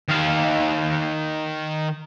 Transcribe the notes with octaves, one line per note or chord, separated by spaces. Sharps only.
D#3 F5